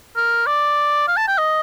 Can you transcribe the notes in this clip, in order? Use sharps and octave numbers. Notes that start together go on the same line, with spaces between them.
A#4
D5
F5
A5
G5
D#5